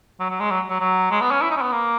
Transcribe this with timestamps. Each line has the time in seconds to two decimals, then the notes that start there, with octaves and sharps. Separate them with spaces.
0.20 F#3
0.30 F#3
0.40 G#3
0.51 F#3
0.70 F#3
0.80 F#3
1.11 G#3
1.21 B3
1.31 C#4
1.42 E4
1.50 D#4
1.57 C#4
1.62 B3
1.72 A#3